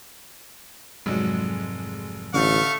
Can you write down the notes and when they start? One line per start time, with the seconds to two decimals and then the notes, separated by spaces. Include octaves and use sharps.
1.06 F1 G#2 F#3 G#3
2.34 A1 D3 A3 F5 C#6